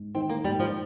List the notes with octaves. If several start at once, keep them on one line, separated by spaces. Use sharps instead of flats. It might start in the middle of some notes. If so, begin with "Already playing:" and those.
Already playing: G#2
D#3 C4
A#3
G#2 G3
F3